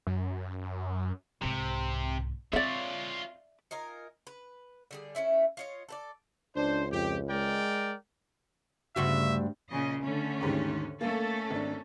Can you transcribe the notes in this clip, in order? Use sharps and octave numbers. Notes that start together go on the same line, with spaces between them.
F#2
C2 G#2 C3
C4 F4 C#5 D5 E5
D#4 F4 A#4 G#5
B4
D3 G3 G#4
A3 C#4 E4 E5
F4 C#5 D#5
A4 B4 D5
C#2 D4 C5
F2 G4
G#3 A#4 D5 G5
D2 G2 C#3 F#4 E5
A#2 C#3 D#5
D3 A3 C#4
D#2 G#2 D#3
A3 A#3 C#4 A4
G#1 D4